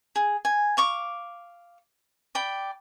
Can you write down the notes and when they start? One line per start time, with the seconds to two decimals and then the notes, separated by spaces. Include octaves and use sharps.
0.16 G#4
0.45 G#5
0.77 F5 C#6 D6
2.35 D5 G5 B5